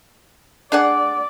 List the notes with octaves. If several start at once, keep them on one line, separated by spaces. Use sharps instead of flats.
D4 G#4 D5 F#5